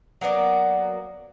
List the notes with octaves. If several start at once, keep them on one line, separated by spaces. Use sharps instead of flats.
F#3 A#3 B3 D5